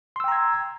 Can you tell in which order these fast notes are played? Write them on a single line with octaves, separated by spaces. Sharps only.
C6 E6 G5 A#5 G#6